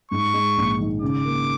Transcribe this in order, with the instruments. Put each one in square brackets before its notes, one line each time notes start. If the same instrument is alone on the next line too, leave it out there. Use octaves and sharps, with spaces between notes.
[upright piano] G#2 [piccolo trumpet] C#6
[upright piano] G#3
A#1
D#3
[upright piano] C#3 [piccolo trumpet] D6
[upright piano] A#3